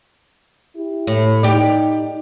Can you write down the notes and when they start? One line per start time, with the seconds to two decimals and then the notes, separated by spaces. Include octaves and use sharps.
0.76 E4 G4
1.07 A2
1.43 D#4 G4 D5